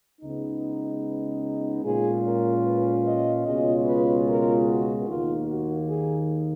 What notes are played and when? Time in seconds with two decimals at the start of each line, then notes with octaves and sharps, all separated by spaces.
0.21 C#2 C#3 G#3 B3 D#4
1.84 A#2 G#3 C#4 F4 G#4
2.24 A#4
2.65 B4
3.05 D#5
3.45 C#2 B2 G#3 C#4 F4 D#5
3.86 B4
4.27 A#4
4.67 F#4
5.07 D#2 D#3 A#3 F4
5.48 F#4
5.89 G#4